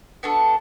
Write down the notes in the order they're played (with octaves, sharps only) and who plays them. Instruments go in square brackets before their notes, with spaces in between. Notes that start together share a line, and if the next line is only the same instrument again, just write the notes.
[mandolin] B3 D4 F#4 A4 A5